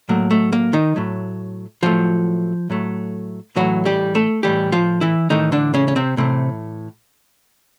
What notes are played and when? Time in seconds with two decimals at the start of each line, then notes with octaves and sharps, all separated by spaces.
0.09 A2 F#3 A3 A#3
0.31 A3
0.52 A#3
0.73 D#3 D#4
0.96 A2 F#3 A3
1.83 A2 F3 F#3 A3 F4
2.70 A2 F#3 A3
3.56 A2 E3 F#3 A3 F#4
3.85 G3 G4
4.15 A3 A4
4.43 A2 E3 G3 A3 G4
4.72 F3 F4
5.01 E3 E4
5.30 A2 D#3 E3 A3 D#4
5.52 D3 D4
5.74 C#3 C#4
5.88 C#4
5.96 C3 C4
6.17 A2 C3 E3 A3 C4